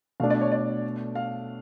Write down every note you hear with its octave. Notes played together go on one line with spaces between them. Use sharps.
B2 A3 D4 F5
D5
C#5
D5
F5